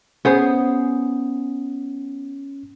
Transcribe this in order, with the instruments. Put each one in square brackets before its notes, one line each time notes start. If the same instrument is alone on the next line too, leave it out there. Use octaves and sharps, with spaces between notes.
[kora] B3 G#4 C5 [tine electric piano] C#4